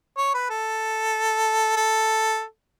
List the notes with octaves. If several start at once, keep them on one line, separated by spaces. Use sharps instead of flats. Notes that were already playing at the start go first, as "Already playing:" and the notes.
C#5
B4
A4
A4